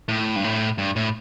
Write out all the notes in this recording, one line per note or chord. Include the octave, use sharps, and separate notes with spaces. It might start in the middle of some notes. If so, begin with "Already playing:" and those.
A2
G2
A2
G2
A2